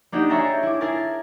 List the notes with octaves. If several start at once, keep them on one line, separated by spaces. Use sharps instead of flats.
A#3 D4 D#4 F#4 G4
G#4 C#5 E5 G5 A5 A#5
E4 D6
E4 G#4 A#4 A5 A#5